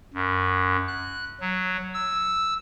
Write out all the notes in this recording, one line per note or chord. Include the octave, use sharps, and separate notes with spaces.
F#2
F#6
F#3
E6